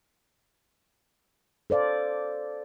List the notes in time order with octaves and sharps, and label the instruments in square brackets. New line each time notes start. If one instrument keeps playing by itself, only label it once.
[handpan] A4 C5 D5 F5